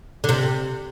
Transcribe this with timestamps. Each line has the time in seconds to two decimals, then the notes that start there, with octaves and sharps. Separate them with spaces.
0.24 D3
0.29 C3